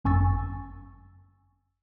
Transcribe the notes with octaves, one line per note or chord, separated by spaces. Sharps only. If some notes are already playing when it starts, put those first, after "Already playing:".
G1 F#2 G#5 C#6 E6 A6